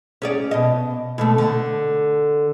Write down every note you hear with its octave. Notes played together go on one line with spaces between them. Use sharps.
C#4 G#4 D5
B2 D#5
B2 D3 A3
D3